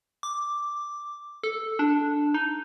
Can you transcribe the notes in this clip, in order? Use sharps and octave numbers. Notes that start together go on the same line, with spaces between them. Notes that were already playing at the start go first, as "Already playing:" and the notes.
D6
A4
D4
D#4